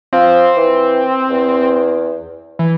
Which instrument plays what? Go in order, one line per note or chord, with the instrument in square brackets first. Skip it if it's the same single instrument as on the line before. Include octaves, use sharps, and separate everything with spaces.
[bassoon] F3 [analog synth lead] C4
[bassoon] E3
E2
[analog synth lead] E3